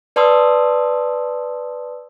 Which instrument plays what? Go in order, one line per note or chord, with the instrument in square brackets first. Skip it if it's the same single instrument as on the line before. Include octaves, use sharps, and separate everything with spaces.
[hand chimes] B4 D5 A5 C6 D#6 E6